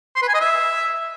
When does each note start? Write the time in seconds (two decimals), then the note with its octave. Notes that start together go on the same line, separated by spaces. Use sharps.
0.16 C6
0.22 B4
0.28 G#5
0.34 D#5
0.40 E5